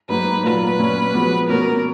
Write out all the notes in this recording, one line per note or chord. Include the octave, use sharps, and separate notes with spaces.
G#2 F#3 A#3 D#4 B4
A#2 F#3 A#3 F4 B4
A#2 F#3 C#4
F3 G#3 B3 F#4
B2 A#3 C#4 F#4 A#4